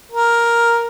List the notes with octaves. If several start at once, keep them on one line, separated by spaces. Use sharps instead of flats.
A#4